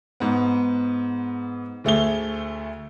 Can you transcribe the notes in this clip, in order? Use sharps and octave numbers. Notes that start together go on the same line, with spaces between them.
G#2 B3
D2 A3 G#4 G7